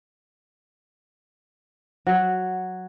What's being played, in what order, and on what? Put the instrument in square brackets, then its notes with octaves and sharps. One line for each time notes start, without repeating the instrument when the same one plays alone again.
[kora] F#3